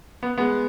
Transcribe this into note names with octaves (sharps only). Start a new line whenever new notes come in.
B3
G#3 B3